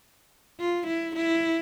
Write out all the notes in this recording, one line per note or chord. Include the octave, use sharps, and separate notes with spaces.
F4
E4
E4